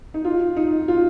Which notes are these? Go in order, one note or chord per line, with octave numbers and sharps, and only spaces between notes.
D#4
F4
D#4
F4